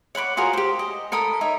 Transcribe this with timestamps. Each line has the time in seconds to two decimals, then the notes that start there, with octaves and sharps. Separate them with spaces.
0.15 C#5 F#5 B5 D6
0.37 F4 F#4 G#4 A#4
0.53 G4 C5
0.79 D#5
1.12 A4 A#4 B5 D#6
1.41 D#4 C#5 E5